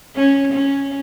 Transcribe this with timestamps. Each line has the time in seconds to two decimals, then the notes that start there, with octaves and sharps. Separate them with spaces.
0.16 C#4
0.52 C#4